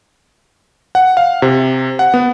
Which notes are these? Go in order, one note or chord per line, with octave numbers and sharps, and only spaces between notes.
F#5
F5
C3
F#5
B3